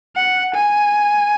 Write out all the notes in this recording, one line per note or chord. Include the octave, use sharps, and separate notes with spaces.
F#5
G#5